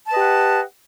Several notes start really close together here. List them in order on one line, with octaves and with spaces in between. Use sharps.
A5 B4 D#5 G4 F#5